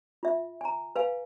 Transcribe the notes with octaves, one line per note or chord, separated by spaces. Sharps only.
F4 E5
G#5 A#5
B4 F5 G#5